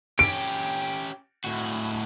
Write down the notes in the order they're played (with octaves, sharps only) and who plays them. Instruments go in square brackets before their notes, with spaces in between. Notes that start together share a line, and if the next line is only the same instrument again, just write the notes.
[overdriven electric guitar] C#4 G4 [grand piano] D7
[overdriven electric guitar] A2 F#4